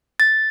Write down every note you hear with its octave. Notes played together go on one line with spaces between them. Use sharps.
A6